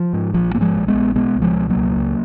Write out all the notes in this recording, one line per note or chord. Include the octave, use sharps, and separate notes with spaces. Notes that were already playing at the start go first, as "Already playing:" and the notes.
Already playing: F3
G#2
A#1 F3
G#2 A#3
F3 G#3
A#1
G#3 B3
A#1
B2 G#3 B3
C#2
F3 G#3
B2
F#3 A#3
C#2
C#2